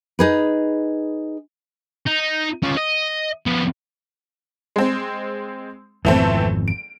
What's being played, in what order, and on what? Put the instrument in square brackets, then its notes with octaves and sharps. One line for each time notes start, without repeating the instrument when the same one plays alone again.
[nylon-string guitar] D#4 G#4 B4
[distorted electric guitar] D#4
C#4 F4
D#5
F3 B3
[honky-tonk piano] G#3 C4
[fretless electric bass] G#1 F2 B2 [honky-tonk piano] E3 A3 C4
[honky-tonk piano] D7